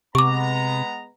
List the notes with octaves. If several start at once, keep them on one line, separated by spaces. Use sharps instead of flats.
C3 G#3 B3 A#5 C#6 D6